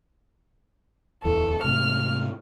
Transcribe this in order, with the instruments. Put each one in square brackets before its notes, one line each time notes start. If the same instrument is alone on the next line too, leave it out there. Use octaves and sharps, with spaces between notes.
[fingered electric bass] D1 E2 E3 [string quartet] A4
[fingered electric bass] G#2 C3 A3 [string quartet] F6